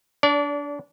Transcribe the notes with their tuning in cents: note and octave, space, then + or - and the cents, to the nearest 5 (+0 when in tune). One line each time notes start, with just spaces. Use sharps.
D4 -15 D5 -35